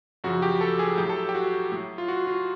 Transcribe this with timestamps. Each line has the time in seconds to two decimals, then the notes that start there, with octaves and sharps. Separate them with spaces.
0.24 F#2 C#3 F3 F#4
0.42 G4
0.61 A4
0.79 G#4
0.97 A2 F#3 G4
1.09 A4
1.29 G4
1.35 F#4
1.72 A2 F#3
1.98 F4
2.08 F#4
2.27 F4